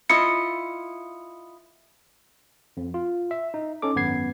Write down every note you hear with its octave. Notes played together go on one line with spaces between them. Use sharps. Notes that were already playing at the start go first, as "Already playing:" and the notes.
E4 F4 D#5 C#7
F2
F4
E5
D#4
C#4 D#4 A4 D6
G#1 F#2 B3 B4 G#6 C7